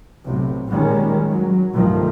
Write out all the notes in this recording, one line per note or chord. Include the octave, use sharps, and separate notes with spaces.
B1 A2 C3
A#2 D#3 G3 G#3 C#4
F#3
B1 G2 D#3 F3 A3